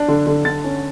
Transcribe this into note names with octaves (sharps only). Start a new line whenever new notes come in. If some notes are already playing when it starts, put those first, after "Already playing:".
Already playing: D4
D3
D3
D3 A6
C#4